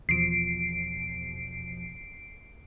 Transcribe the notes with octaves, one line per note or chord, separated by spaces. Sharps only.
E2 B2 F3 C7 D7